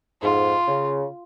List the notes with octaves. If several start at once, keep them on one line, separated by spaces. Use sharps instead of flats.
F2 G#2 F4
C#3